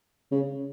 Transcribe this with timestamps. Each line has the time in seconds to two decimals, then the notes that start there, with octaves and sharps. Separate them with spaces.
0.32 C#3